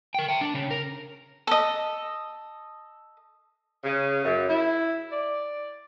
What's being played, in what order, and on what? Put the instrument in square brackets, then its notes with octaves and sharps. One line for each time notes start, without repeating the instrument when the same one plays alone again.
[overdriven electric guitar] A#4 G5
E5 G5
D4
C#3 C#4
A#4
[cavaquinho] A4 D#5
[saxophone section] C#3
F#2
E4
D5